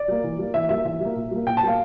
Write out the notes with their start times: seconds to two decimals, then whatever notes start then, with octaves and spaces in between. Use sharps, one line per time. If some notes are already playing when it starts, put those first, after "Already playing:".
Already playing: D5
0.08 G3 A#3
0.24 E3
0.39 G3 A#3
0.54 E3 E5
0.69 G3 A#3 E5
0.85 E3 E5
1.00 G3 A#3
1.15 A#2
1.31 G3 A#3
1.46 A#2 G5
1.57 A5
1.63 G3 A#3 F5